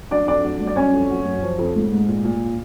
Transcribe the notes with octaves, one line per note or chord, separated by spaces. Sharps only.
F#3 D4 D5
F2 D4 D5
F#3
G2
D5
F#3 C#4 C#5
F2
F#3
F#2
F3
F2
G#2
G#2
A#2
A#2